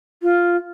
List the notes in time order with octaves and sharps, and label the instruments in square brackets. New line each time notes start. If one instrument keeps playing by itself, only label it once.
[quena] F4